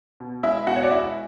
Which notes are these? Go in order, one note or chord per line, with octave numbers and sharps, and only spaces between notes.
B2
G#3 E4 E5
B2 F#4 F#5
C#5
D5
G#3 E4 E5